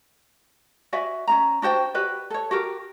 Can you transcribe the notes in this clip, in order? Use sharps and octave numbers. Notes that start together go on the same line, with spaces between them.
F#4 D5 E5 G#5
C#4 D4 A#5
D4 F#4 C5 G5
F#4 G4 B4 D5
A4 C#5
F#4 G4 A#4